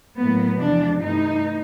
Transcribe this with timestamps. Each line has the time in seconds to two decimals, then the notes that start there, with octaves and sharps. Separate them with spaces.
0.18 A2 F#3 A#3 B3
0.60 E2 C3 F3 G#3 D4
1.02 G2 E3 A3 D#4